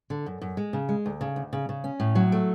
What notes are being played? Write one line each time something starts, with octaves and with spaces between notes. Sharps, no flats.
D3
F#2
F#2
G#3
C#3
G#3
D2
C#3
D2
C#3
C#3
C#4
A2
F#3
A3